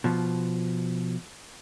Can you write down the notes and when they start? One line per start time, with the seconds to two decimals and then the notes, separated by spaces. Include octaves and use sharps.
0.04 B2 F3